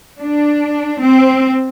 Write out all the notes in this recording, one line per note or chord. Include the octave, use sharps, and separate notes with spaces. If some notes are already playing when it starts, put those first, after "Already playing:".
D4
C4